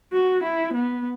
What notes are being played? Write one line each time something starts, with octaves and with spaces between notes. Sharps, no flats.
F#4
E4
B3